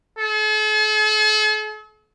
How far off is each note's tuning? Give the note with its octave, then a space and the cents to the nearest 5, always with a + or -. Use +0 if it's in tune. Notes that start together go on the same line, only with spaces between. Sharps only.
A4 -45